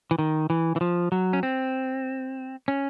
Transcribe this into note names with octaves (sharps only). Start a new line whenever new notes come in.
E3
D#3
E3
E3
F3
F#3
C#4
C4
C#4